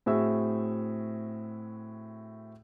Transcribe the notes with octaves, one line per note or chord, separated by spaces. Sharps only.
A2 C4 F#4 G#4 E5 E6